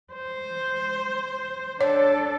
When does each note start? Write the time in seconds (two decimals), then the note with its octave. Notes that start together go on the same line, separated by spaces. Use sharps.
0.13 C5
1.81 D4 A4 C#5